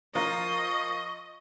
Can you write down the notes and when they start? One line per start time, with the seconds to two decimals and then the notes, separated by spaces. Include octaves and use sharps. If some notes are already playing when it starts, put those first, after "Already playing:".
0.15 F3 F4 A#4 D#5 C#6